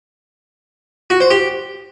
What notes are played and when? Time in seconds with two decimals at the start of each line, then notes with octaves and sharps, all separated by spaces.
1.10 F#4
1.20 C5
1.31 G4